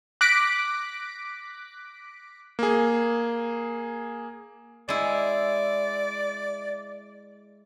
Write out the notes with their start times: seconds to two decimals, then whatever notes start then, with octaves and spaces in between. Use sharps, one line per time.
0.21 D6 F#6 A#6 B6 D7
2.59 A#3 G#4
4.89 G#3 E4 D5